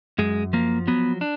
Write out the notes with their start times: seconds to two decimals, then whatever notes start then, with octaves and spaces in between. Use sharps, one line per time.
0.18 F#2 G#3
0.53 F3 A#3
0.87 F#3 B3
1.21 D4